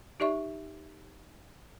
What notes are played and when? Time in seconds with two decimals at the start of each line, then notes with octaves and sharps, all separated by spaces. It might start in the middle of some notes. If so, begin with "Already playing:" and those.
0.20 D#4 G4 D5 E5 C#6